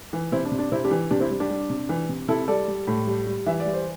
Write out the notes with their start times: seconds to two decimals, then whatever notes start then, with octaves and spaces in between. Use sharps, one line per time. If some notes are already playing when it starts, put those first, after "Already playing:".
0.13 E3
0.32 C3 C4 E4
0.45 D4
0.51 C3
0.59 D4
0.72 C3 C4 E4
0.84 D4 G4
0.91 E3
1.11 C3 D4 G4
1.20 C4 E4
1.31 G3
1.40 D4 G4
1.50 G3
1.70 C3
1.89 E3
2.09 C3
2.28 C3 E4 A4
2.48 G3 A4 D5
2.68 G3
2.87 A2
3.07 G3
3.27 G3
3.46 E3 E5
3.60 D5
3.66 G3
3.73 C5